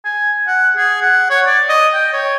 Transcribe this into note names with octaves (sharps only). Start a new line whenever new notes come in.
G#5
F#5
G#4
F#5
C#5
D5
D#5
G5
C#5